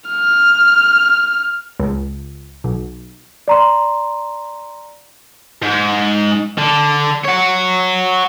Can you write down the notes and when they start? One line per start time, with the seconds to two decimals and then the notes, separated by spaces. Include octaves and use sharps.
0.10 F6
1.80 C#2
2.64 B1
3.48 D5 A#5 C6
5.62 G#2
6.58 D3
7.25 C#5 F#5